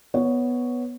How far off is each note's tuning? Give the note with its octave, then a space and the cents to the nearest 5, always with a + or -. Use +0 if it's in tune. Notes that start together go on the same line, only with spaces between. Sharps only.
B3 +0 C#5 +0